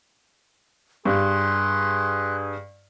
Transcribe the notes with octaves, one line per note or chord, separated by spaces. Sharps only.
G2 G#4 C6 F#6